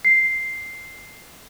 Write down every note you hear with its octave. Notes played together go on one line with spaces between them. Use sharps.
C7